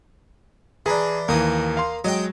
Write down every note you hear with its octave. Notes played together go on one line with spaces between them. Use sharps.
E3 D4 G#4 A#5
D#2 E3 A#3 D#6
F5 C6
F#3 G#3 D#5 G5